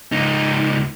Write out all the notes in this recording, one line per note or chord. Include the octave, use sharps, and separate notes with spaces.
C#2 D#4